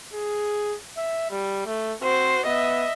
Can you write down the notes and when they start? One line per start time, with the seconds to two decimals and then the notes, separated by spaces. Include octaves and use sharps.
0.14 G#4
0.97 E5
1.30 G3
1.66 A3
2.02 C4 F#4 C5
2.46 B3 D#5 E5